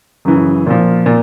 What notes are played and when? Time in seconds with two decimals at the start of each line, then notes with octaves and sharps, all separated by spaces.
0.25 F#2 C#3 E3
0.67 A#2 F3
1.06 A#2